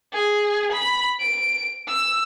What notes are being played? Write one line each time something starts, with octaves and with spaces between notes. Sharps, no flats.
G#4
B5
D7
E6